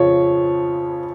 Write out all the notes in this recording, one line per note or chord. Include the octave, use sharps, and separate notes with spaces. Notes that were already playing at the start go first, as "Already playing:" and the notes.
Already playing: F2 C#3 F3 C#5